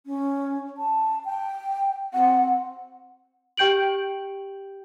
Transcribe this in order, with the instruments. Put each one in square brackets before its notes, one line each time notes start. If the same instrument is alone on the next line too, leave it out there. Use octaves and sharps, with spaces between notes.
[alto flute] C#4
A5
G5
[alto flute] C4 [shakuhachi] F#5
[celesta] G4 G5 G6 D7 F#7